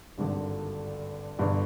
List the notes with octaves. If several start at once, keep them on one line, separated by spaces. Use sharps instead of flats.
G#1 G2 D3
G1 G2 D3